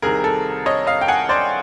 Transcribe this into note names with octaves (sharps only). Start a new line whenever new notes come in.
C2 C3 D#3 G#4 A#4
A4
C#5 D#5
D#5 F5
G5
F#5 G#5
C5 D5